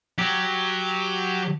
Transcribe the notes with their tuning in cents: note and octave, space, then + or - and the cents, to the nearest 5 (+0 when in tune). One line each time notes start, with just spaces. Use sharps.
F#3 +0 G4 +0